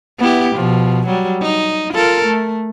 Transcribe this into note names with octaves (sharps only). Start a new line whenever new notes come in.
B3 E4 G4
B2 F3
F#3 G3
D#4
F4 A4 A#4
A3